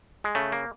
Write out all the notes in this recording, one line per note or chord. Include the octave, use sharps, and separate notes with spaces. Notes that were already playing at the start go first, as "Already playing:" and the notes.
G#3
C#3 A3
A#3